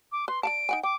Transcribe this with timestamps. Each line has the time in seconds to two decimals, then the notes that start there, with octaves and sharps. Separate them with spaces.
0.12 D6
0.28 B4 C6
0.43 D5 F5 A5 D7
0.69 D#4 F#5 G#5
0.83 G5 D6